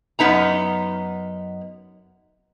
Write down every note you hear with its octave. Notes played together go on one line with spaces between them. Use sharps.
F#2 A#2 B3 D#4 A#5